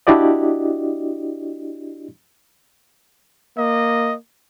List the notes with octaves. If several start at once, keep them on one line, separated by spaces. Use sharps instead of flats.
D4 E4 F#4 G4 D5 D#5
A#3 D#5